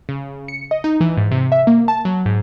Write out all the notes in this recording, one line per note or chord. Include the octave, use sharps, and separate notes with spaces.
C#3
C#7
D#5
D#4
E3
G#2
C3
E5
A#3
A5
F#3
G#2